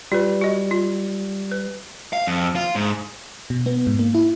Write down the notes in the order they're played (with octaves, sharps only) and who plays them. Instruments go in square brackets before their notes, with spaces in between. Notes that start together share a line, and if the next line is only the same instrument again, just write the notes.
[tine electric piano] G3 [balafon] F4 B4
[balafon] F#4 D#5
F4
B4
[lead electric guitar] F5
F2
F4
G#2
[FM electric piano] B2
B3
G#2
A#3
E4